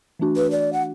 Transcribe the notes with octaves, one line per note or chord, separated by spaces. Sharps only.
E3 A3 D4 F#4
B4
D5
F#5